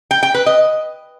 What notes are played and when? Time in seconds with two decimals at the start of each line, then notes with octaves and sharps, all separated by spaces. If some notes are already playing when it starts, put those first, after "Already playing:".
0.11 G5
0.23 G5
0.35 B4
0.46 D#5